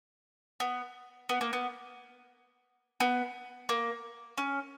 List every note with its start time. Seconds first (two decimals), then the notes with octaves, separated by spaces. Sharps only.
0.60 B3
1.29 B3
1.41 A#3
1.53 B3
3.00 B3
3.69 A#3
4.38 C#4